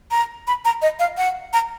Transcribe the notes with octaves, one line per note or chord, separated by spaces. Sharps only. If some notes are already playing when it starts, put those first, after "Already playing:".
A#5
B5
A#5
D#5
F5
F#5
A#5